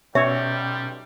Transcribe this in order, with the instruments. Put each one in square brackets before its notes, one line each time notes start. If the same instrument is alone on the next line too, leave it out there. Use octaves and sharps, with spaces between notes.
[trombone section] B1 G3 [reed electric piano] B2 C#4 E6 [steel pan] C#5 [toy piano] E5